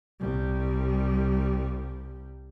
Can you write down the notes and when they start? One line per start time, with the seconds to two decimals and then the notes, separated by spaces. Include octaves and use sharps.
0.20 C2 G3